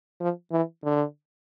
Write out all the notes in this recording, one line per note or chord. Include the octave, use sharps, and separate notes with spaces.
F3
E3
D3